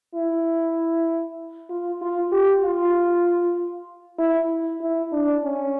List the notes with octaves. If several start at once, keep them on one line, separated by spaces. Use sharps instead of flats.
E4
F4
F4
G4
F4
E4
E4
D4
C#4